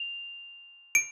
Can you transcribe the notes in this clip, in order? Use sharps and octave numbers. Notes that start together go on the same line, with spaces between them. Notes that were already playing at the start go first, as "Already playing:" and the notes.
Already playing: F7
D7